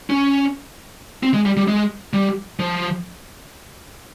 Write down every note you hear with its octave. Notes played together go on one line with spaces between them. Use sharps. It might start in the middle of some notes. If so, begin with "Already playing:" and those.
C#4
C4
G#3
G3
G3
G#3
G3
F3